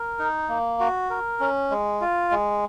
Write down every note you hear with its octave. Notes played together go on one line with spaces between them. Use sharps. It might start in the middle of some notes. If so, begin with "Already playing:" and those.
Already playing: A#4
D#4
A#3
F#4
A#4
C#4
G#3
F4
G#3